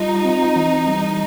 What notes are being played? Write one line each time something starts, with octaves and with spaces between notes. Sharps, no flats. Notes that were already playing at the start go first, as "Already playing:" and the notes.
Already playing: G3 D#4 F4
C4
E3
G3